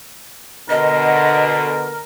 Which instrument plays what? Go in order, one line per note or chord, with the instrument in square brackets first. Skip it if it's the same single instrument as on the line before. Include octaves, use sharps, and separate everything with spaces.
[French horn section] B2 D3 [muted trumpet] A#4 [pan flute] D#5